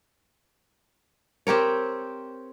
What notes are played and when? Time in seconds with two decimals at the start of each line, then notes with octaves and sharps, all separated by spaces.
1.47 C4 G4 A#4 C#5